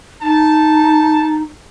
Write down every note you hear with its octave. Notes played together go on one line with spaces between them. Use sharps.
D#4 A5